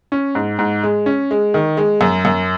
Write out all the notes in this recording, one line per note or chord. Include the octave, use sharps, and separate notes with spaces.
C#4
G#2
G#2
G#3
C#4
G#3
D#3
G#3
F#2
F#2